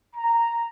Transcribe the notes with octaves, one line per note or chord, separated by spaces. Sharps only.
A#5